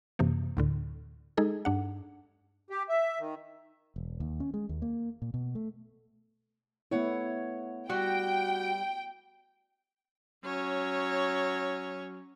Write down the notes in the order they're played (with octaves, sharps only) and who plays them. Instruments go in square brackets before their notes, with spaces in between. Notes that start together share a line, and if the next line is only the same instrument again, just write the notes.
[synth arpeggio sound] F#2 C3 E3 A#3
D2 A2 D3
G#3 D#4 G#4 A4
G2 D4 F#5
[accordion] G4
E5
D#3
[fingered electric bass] E1
D#2
C#4
G#3
D#2
A#3
A#2
B2
A3
[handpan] A3 B3 E4 [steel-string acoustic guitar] C#5 F#5
[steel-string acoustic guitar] G3 [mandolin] F#4 [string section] G5
[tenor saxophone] F#3 [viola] C#4 C#5